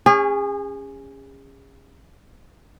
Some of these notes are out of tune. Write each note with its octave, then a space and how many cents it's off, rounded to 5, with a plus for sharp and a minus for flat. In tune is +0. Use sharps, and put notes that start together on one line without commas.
C#4 +0 G#4 -35